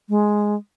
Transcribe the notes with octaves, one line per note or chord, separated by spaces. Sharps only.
G#3